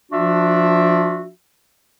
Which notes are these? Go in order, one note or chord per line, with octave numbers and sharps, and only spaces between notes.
F3 D4 F4 F#4 E5